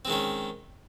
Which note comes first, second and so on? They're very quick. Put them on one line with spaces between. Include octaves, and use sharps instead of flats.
C4 G#3 D#3 C#4